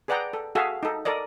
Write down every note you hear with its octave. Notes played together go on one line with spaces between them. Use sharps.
G#4 B4 D5 F#5 G5 A#5
A4
F#4 G#4 A4 E5 F5
D#4 A4
A4 A#4 D5 D#5